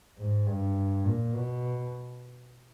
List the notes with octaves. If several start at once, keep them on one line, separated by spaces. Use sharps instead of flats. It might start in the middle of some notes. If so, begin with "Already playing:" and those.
G#2
G2
A#2
B2